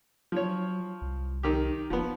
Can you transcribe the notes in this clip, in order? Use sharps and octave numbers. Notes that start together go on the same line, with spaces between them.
F3 F#3 C#5
C2
D#3 G4
E1 F3 B3